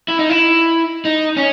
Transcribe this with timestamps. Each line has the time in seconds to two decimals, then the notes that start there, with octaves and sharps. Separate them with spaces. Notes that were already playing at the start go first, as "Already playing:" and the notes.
0.08 E4
0.19 D#4
0.29 E4
1.05 D#4
1.37 C#4